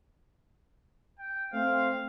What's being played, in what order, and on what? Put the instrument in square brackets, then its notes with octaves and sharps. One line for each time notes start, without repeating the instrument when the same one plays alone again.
[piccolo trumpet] G5
[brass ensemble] A3 C4 [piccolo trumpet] F5